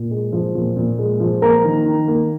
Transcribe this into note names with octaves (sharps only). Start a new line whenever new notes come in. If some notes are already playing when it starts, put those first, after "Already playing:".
Already playing: A#2
G#3
F3
A#2
A#2
G#3
F3
A#3 A#4 A#5
D#3
D#3
A#3